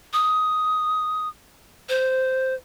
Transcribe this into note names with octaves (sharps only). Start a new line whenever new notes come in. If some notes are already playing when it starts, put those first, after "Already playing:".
D#6
C5